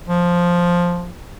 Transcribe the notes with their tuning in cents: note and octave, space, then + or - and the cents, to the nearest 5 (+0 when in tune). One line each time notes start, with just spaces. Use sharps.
F3 +5